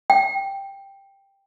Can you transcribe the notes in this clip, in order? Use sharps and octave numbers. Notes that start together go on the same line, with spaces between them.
G5